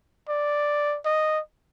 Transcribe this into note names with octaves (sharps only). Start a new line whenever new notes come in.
D5
D#5